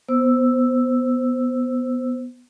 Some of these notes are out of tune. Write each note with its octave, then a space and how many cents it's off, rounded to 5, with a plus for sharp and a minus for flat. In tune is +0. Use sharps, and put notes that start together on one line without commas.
B3 +0 C5 +0 E6 +0